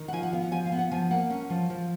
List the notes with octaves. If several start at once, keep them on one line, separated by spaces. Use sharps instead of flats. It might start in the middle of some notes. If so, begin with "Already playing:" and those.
Already playing: D#3
F#5
F3 G#5
F#5
B3 F5
F#5
F3 G#5
F5
B3
F#5
F3 G#5
A#3 F#5
C#4
F3
F3